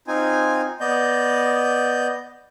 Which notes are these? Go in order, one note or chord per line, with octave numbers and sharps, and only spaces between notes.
C4 D#4 F4 G#5
B3 D5 D#5 G6